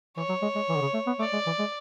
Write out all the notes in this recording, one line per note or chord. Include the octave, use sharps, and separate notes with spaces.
E3 C#5
F#3
G#3
G#3
E3
D3
C#3
A3
B3
A3 D5
G#3
E3
G#3